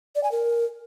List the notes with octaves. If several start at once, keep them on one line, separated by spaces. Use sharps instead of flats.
D5
G#5
A#4